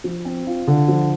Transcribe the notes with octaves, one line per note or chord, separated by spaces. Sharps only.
F3
C4
F4
D3
F3